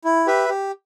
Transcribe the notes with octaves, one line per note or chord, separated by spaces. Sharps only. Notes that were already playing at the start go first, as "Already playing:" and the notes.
E4
G4 B4 E5
G4